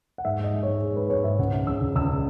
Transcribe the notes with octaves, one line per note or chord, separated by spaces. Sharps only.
F#5
G#2 E5
G#2 D#5
G#3
G#2 C#5
G#3
G#2 B4
G#2 C#5
G#2 E5
C#2 F#5
C#3
C#3 E6
C#2
C#2 E6